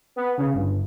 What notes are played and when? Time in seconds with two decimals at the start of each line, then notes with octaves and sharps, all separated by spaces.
0.16 B3
0.38 C#3
0.53 G1